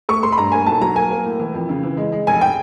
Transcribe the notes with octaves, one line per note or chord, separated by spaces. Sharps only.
A3 C#6
A3 C6
B5
G2 A#5
A#3 G#5
B1 A5
F#3 A#5
A#3 G#5
A#3
A2
E3
F2
C#3
E3
G#3
G#3
F1 G#5
G5